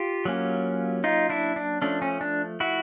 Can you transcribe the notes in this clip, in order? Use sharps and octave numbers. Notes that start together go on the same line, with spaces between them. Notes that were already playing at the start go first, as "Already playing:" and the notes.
Already playing: F4 G4
F#3 A#3 C#4
D#4 F4
D4 E4
D4
F3 A3 C#4 D4
C#4
D4
E4 F#4